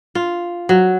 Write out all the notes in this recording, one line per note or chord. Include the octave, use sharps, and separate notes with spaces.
F4
F#3